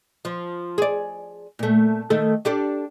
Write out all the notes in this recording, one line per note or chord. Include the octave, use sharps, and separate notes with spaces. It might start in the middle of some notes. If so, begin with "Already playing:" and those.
F3
G#4 D5
A#2 A3
D#3 A3 A4
D4 G4 A4